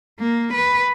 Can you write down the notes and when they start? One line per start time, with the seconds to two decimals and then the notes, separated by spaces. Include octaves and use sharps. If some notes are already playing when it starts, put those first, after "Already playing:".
0.20 A#3
0.53 B4